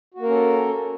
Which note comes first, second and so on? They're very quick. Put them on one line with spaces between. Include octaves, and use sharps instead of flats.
F#4 A#3 A#4 C#4 A4